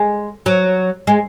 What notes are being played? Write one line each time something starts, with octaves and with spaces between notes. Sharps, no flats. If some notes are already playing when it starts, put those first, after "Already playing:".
Already playing: G#3
F#3
G#3